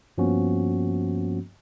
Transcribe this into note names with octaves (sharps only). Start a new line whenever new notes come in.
G2 F3 A#3 B3 C#4 F#4